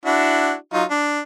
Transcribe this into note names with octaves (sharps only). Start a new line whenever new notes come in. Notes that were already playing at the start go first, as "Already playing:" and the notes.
D4 E4 F#4
F#3 D#4 F4
D4